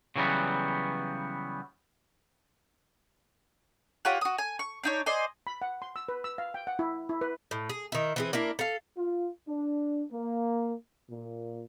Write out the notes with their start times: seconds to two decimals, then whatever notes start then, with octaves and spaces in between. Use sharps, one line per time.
0.16 C#3 E3 F#3 G3 B3
4.05 F4 G4 C#5 F#5
4.21 F#4 D#6
4.38 G#5
4.59 C#6
4.84 D4 D#4 C#5
5.06 C5 D5 D#5 G#5
5.47 B5
5.62 F#5
5.82 C6
5.96 E6
6.09 B4
6.24 E6
6.38 F5
6.54 G5
6.67 F#5
6.79 E4
7.09 E4
7.21 B4
7.51 A2
7.69 G#4
7.92 D#3 E4
8.16 E3 C4 G#4
8.33 A#3 D4 E4
8.59 A4 F5
8.97 F4
9.48 D4
10.12 A#3
11.10 A#2